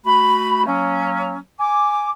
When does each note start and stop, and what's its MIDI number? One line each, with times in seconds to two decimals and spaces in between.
0.05 0.65 57
0.05 0.65 66
0.05 0.65 83
0.66 1.38 54
0.66 1.38 58
0.66 1.38 61
1.59 2.10 80
1.59 2.10 86